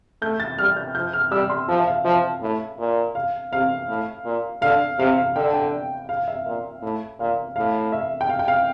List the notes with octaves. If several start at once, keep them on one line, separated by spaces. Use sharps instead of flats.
A3 G6
A6
G3 F6
G6
F3 G6
F6
G3 E6
C6
F3 A5
E5
F5
F3 E5
A2
A#2
F5
C3 F5
A2
A#2
D3 F5
C3 F5
F5
D3 G5
G5
F5
E5
A#2
A2
A#2 F5
A2 F5
E5
G5
F5
G5
F5